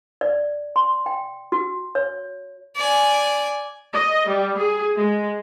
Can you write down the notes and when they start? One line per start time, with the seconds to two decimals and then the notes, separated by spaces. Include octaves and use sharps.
0.21 D5
0.76 C6
1.06 G5
1.52 F#4
1.95 C#5
2.76 D5 G#5
3.94 D#5
4.29 G3
4.59 G#4
4.99 G#3